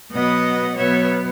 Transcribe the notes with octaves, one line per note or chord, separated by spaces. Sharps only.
B2 F#3 B3 D#5 F#5
B2 F#3 B3 C#5 E5